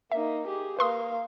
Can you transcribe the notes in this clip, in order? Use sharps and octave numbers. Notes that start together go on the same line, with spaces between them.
A#3 D#4 E5
G4 G#4
A#3 B4 F5 C6 D#6